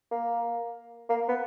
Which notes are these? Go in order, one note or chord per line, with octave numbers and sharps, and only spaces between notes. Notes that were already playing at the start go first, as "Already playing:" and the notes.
A#3
A#3
B3